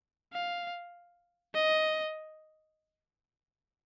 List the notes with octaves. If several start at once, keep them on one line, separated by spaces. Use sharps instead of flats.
F5
D#5